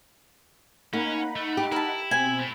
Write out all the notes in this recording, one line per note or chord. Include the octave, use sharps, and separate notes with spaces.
A#3 C#4 D#4 F#5 B5
A3
G4
E4 A#4 A5
B2 C4 G#5
A3 E4